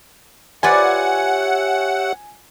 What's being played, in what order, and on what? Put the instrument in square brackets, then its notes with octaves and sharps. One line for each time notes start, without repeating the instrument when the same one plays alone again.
[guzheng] F4 B4 D5 [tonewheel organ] G4 C#5 E5 [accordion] F#5 [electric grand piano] G#5